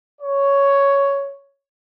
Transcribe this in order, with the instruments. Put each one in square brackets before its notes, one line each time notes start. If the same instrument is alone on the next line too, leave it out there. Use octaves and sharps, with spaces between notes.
[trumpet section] C#5